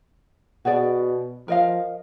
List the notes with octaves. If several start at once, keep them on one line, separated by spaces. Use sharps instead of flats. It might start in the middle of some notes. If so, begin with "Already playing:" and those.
B2 F#4 G#4 D5
F3 A#4 D#5 F5